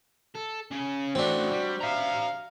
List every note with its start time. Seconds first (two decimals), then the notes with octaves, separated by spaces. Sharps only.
0.35 A4
0.71 C#3 C#4
1.15 E3 A3 C4 D4 F#4
1.51 G3
1.81 E5 F5 A#5